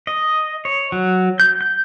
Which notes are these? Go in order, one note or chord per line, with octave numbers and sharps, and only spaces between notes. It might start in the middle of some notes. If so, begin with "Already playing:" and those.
D#5
C#5
F#3
G6
G6